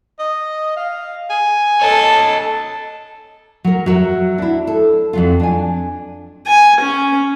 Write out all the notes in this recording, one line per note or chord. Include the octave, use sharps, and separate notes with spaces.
D#5
F5
G#5
A4 C#5 D#5 A5
F#3 A#4
F#3 F#4 A#4 E5
D4 E4
A4
F2 F#3 F4
D4 G#5
G#5
C#4